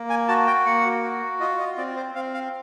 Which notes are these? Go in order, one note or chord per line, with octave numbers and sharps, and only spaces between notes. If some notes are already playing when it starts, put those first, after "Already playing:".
Already playing: A#3
G#5
F#4 A5
G5
A#3 F#5
F#4
F4 D#5
D#5
C4 D5
C5
C4 F5
F5